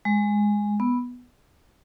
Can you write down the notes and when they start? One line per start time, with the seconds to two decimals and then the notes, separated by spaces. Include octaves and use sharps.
0.05 G#3
0.80 B3